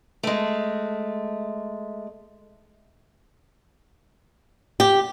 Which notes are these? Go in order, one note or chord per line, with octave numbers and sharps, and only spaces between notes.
G#3 A3
G4